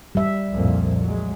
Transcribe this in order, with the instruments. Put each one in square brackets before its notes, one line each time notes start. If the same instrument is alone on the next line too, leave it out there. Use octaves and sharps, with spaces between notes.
[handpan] G3 E5
[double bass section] C2 F2 A#2
F#3 G#3